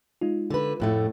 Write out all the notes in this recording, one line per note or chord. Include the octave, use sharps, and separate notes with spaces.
G#3 D#4 F4
D3 B4
F2 A2 A3